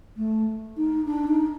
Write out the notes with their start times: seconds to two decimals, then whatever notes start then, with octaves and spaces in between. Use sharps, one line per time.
0.16 A3
0.77 D#4
1.05 D4
1.28 D#4